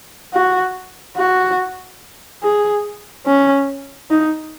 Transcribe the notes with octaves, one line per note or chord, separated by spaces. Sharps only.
F#4
F#4
G#4
C#4
D#4